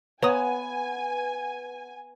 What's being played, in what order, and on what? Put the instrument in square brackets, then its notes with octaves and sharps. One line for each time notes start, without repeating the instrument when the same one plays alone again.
[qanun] B3 [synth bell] B4 F#5 [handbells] C#5 A#5 D#6 [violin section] G#5